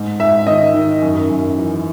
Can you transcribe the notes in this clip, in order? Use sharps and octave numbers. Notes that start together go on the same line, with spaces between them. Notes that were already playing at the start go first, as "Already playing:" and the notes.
Already playing: G#2
G#2 E5
D#3 D#5
D#3
F#2
F#2
E3